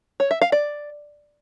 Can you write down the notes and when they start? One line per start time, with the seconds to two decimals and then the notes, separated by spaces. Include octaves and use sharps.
0.20 C#5
0.31 E5
0.42 F5
0.52 D5